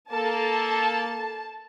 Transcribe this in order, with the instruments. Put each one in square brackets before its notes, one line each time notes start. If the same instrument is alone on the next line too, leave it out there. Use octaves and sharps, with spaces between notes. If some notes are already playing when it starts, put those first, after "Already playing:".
[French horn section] A#3 A4 [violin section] A5